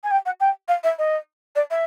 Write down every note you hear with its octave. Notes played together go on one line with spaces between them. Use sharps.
G#5
G5
F#5
G5
F5
E5
D#5
D5
E5